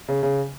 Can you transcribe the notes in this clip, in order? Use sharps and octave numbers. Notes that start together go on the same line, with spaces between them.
C#3
C#3